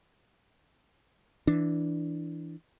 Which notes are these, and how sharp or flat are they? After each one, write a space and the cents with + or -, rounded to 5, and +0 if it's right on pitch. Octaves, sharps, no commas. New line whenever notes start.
E3 +0 D4 +0